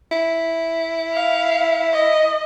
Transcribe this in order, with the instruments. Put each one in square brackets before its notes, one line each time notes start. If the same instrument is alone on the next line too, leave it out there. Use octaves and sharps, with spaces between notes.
[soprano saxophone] E4
[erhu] F5
D#5